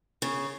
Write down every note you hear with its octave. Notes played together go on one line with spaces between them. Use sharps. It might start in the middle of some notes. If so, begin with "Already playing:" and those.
C#3